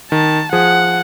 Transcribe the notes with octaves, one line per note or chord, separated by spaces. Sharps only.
D#3 A5
F3 G#4 F#5